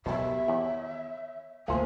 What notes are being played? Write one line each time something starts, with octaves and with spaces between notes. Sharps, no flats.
B1 B2 D#3 B3 G4 E5
E2 C#5
D2 A3 A#3 F4 A#4 C5 F5 G#5